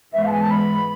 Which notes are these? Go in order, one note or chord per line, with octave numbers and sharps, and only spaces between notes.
G#2 E3 G#3 B3 E5
F5
A5
G#5
A5
B5